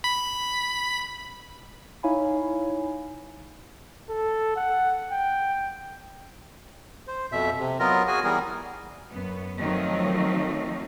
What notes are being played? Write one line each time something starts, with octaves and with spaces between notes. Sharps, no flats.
B5
D#4 E4 C#5 F5 G#5 B5
A4
F#5
G5
C5
F2 B2 E5
C3
F#3 B3 F4 A#4 D#5
F#4 G#4 G#5
E3 G3 B3 G#4 A#4
F#2 B3
D#3 F3 F#3 A3 C4 D#4